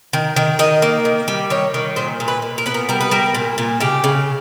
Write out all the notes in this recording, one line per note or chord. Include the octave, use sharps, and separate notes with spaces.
D#3
D#3
D#3 D#5
A#3
D#3
G3
D#3 C#5
D#3
A#2 C5
A#2
B4
A#2
A#4
B3 B4
A#4
G3 A#4
B4
G3 A#4
A#2
A#2
C#3 G4
C#3